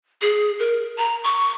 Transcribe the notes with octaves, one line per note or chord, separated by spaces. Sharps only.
G#4
A#4
A#5
C#6